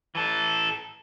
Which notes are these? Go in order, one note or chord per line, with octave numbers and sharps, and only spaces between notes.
E3 A4